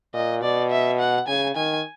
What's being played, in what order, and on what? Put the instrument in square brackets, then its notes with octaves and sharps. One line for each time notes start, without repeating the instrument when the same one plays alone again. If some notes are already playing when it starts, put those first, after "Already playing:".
[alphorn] A#2 [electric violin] D#5
[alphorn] B2 [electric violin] D5
[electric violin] E5
F#5
[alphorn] C#3 [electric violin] G#5
[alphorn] D#3 [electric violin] G#5